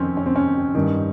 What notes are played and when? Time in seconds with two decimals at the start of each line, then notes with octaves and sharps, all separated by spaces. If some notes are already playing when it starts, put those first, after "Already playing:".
Already playing: F2 D#3 C4 C#4
0.17 C#4
0.26 C4
0.36 C#4
0.75 G2 D#3